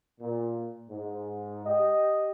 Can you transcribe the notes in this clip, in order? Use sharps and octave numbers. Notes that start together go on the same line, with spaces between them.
A#2
G#2
G4 D#5